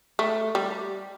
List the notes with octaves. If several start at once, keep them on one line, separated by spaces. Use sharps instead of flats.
A3
G3